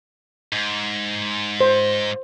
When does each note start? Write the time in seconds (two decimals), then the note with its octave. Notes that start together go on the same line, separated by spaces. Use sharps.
0.52 G#2
1.61 C5